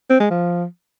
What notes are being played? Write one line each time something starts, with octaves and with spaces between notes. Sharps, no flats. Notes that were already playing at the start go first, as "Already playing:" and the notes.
C4
G#3
F3